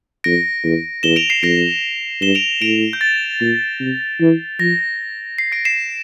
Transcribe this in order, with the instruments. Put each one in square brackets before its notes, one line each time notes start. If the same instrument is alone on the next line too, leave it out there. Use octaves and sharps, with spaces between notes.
[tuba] F2 [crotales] A#6 D7
[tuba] E2
[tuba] E2 [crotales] E7 G7
[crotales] D7 F7
C7 E7
[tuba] F2 [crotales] A#6 D7
[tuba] G2 [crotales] E7 G7
[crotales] D7 F7
[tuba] A2 [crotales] D7 F7
[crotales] G6
A6
[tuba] A#2
C3
E3
[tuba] F3 [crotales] A#6
[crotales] C7
A#6 D7
C7 E7